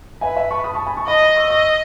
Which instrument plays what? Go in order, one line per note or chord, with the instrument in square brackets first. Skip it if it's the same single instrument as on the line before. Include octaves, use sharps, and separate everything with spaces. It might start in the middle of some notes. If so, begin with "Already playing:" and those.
[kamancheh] B4 [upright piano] E5 G#5
[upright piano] E5 G#5
A5 C#6
B5 D#6
A5 C#6
G#5 B5
A5 C#6
[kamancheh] D#5 [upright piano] B5 D#6
[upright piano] B5 D#6
C#6 E6
[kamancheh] D#5 [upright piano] C#6 E6